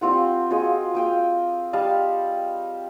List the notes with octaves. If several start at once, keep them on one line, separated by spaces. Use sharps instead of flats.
G3 C4 F4 F#5
F4 F#4 G#4 D#5
F5 G5 D#6
G3 D#5 F5 A5